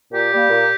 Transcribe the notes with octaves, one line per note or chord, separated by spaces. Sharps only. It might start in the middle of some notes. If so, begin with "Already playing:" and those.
A#2 G4
G3 A#3
A#2